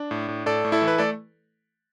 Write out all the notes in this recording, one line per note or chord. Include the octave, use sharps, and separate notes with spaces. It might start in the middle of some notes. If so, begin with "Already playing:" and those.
Already playing: D4
A2
A2
A2 A4 D5
A2
E4 A4
E3
B4
A3 A4 D5